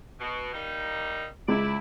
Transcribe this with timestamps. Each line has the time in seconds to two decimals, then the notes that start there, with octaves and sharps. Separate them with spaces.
0.20 B2
0.54 G3 A#3 D#4
1.48 C#2 E4 D5